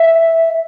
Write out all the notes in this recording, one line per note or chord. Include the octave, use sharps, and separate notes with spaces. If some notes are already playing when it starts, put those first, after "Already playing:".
Already playing: E5